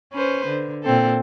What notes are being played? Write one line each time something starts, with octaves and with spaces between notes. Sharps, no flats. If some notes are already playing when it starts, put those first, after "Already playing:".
C#4 B4 C5
D3
A#2 C4 A4